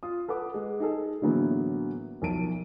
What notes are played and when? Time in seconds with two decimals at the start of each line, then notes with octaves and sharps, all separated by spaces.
0.03 F4 D#6
0.28 A4 B4 F#5 D6
0.54 G#3
0.80 D#4 G#4 A4
1.22 A2 D3 E3 F#3 A#3 B3
2.22 B1 F3 A#4 A5 D7 D#7